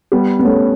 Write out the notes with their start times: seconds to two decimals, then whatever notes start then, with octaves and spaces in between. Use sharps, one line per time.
0.12 G3 B3
0.39 B3
0.45 A3 C#4